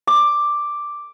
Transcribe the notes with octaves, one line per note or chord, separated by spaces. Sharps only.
D6